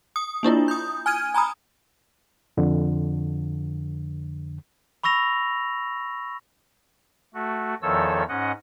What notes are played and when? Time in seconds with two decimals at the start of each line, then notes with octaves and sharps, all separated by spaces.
0.16 D#6
0.43 A#3 D4 E4 F4
0.68 D#6 G6
1.06 G#5 F6 G#6 D#7
1.34 G#5 A#5 B5 D#6
2.57 F2 D3
5.04 B5 C#6 E6 A#6 F7
7.34 A3 F#4
7.82 E2 D#3 F3 A4 C#5 E6
8.29 G#2 C#4 D#5 F#5